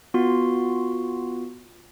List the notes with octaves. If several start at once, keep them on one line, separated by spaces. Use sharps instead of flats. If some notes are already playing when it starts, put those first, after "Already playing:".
B3 F4 F#4 C6